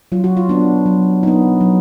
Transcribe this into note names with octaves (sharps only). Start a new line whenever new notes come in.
F#3 F4
F#4
F4
B3 D4
F#3
B3 D#4
F#3